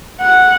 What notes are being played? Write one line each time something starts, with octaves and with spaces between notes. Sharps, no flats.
F#5